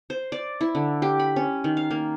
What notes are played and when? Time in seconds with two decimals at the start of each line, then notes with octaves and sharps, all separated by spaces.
0.10 C5
0.32 D5
0.61 E4
0.75 D3
1.02 G4
1.19 B5
1.36 C#4
1.64 D#3
1.77 F5
1.91 A#3